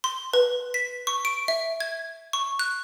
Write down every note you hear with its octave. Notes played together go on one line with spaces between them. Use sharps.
C6
B4
B6
C#6
D7
E5
G#6
C#6
F#6